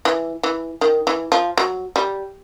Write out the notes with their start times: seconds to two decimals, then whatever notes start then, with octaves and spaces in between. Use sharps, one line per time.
0.05 E3
0.43 E3
0.81 D#3
1.07 E3
1.32 F3
1.58 F#3
1.96 G3